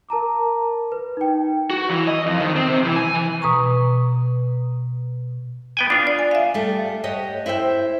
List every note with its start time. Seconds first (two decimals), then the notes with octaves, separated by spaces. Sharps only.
0.09 A#4 A5 A#5 D6
0.92 B4
1.17 D#4 G5
1.70 F#4
1.89 E3
2.07 D#5
2.26 F2
2.39 D#3
2.56 C4
2.67 C3
2.84 E3
2.96 G#5
3.15 E3
3.42 B2 B4 A#5 C#6
5.77 B3 G5 G#5
5.90 D4 F4 D#6
6.07 D5
6.19 G#5
6.31 E5 F5
6.54 G3 A3
7.04 G4 C#5 D#5 F#5
7.46 E4 C5 E5 G5